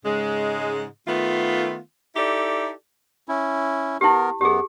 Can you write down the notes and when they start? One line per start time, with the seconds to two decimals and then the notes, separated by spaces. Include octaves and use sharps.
0.06 G#2 C#3 G#3
1.07 D#3 A3 B3 F4
2.16 D#4 E4 G4 A4 D5
3.28 C#4 E4
4.01 B3 E4 G4 A#4
4.41 F#2 B3 G4 G#4